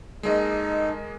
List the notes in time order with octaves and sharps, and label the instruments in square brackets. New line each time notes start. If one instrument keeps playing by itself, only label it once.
[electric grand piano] G#3 A#3 D#5 [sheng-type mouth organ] D#4 A4